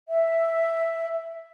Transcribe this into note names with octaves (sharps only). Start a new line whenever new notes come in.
E5